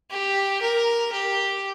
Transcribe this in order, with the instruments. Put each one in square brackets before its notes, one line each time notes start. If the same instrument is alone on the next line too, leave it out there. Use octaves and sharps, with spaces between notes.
[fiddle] G4
A#4
G4